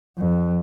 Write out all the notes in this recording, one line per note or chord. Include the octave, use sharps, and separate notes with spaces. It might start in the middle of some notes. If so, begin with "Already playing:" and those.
F2